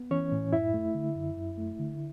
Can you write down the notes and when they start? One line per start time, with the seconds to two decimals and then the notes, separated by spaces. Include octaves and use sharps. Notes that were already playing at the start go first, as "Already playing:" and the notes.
Already playing: B3
0.11 E3 C#4 C#5
0.32 A2
0.53 F#2 E4 E5
0.74 A3
0.95 D3
1.16 F#2
1.37 F#2
1.58 A3
1.79 D3